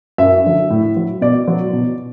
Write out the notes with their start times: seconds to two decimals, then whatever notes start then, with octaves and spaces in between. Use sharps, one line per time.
0.18 F#2 E5
0.45 D3 F#3
0.70 A2
0.96 F#3
1.21 B2 D5
1.48 F#3
1.73 B2